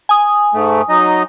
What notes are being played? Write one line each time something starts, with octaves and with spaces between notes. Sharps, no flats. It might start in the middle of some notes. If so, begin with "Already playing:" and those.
G#5 D#6
G#2 A3
F#3 D#4 D#5